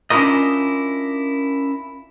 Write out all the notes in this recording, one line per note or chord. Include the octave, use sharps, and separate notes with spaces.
C#4 D4 E4 F4 A#4 D#5